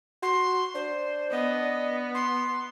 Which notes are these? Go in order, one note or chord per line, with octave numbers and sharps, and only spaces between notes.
F#4 C6
D4 C5
B3 D#5
C6